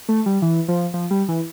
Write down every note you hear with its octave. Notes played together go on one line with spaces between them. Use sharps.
A3
G3
E3
F3
F3
G3
E3